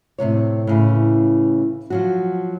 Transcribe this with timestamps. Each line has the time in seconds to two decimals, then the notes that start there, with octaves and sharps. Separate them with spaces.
0.18 A2 C3 F#3 C#5
0.67 A2 C#3 E3
1.90 F3 F#3 F#4